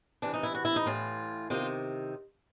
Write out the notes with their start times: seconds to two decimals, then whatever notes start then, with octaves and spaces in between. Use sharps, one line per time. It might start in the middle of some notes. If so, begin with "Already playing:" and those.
0.22 C3 E3 D4
0.34 D#4
0.43 E4
0.55 F#4
0.65 E4
0.76 D#4
0.86 A2 E3 F4
1.50 C3 D#3 F4